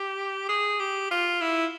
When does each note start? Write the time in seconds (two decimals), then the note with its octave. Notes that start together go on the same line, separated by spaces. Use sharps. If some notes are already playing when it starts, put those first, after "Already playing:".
Already playing: G4
0.49 G#4
0.80 G4
1.11 F4
1.41 E4